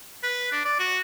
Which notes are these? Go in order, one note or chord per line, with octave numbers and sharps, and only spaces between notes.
B4
D4
D5
F#4